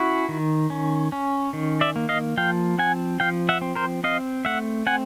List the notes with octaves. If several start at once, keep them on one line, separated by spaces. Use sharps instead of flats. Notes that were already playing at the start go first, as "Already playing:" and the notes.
Already playing: C#4 E4 F#4
D#3
C#4
C#4
D#3
D5 E5
A#3
D#5 F5
F3 F5 G5
C4 F#5 G#5
F3 F5 G5
E5 F#5
C4
A#4 C5
C4 D#5 F5
A3 E5 F#5
C4 F#5 G#5